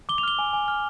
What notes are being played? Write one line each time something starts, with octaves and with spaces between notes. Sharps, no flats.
D6 G7
F7
F6 G7
G#5
G#5
F6